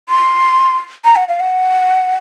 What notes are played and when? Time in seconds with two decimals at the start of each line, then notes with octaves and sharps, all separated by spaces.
0.09 C6
1.04 A#5
1.16 F#5
1.28 F5
1.40 F#5